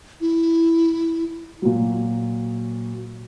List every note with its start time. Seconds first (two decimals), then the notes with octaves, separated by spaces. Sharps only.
0.21 E4
1.62 A#2 F#3